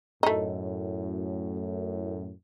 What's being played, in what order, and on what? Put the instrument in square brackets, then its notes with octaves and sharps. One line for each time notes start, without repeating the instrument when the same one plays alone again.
[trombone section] F#2 A2 [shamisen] A3 D#4